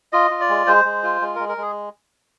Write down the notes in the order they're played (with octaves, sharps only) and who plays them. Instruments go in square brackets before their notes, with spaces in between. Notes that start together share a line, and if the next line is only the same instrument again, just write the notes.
[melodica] F4 D#5
F4
D5
G#3
G#3 C5
G#3
F4
G#3
G#3 A#4
A#4
G#3 G#4